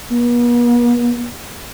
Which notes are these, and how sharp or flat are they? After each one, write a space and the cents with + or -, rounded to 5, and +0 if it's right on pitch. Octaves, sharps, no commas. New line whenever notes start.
B3 -45